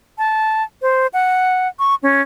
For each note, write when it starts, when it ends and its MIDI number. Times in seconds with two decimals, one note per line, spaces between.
0.18 0.63 81
0.82 1.07 72
1.13 1.68 78
1.79 1.95 85
2.03 2.22 61